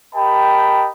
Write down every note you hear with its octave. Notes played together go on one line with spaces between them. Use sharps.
G4 A#4 D#5 G5 A5 B5